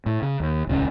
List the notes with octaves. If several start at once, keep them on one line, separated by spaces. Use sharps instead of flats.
A2
C#3
D#2
D#1 C#2 C#4